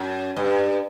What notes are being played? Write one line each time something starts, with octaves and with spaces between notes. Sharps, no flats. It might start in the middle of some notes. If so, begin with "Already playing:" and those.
Already playing: F#2
G2